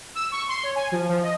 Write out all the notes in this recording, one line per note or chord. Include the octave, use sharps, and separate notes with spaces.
E6
C#6
C6
C#5
G#5
F3
F3
D#5